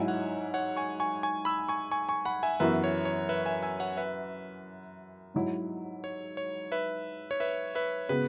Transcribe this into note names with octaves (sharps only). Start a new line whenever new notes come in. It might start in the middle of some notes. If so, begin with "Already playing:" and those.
Already playing: G#2 F#3 E4 E5 G#5
C#5 F#5
C#5 F#5
G#5 C#6
G#5 C#6
G#5 C#6
B5 E6
G#5 C#6
G#5 C#6
G#5 C#6
F#5 B5
E5 G#5
F#2 E3 B3 F#4 B4 E5
C#5
C#5
B4 E5
E5 G#5
E5 G#5
C#5 F#5
B4 E5
G#2 F#3 E4
C#5
C#5
B4 E5
C#5
B4 E5
B4 E5
C#3 G#3 B3 F#4 B4